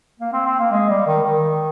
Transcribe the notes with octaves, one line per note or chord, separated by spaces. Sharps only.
A#3
C4
C4
A#3
G#3
G3
D#3
D#3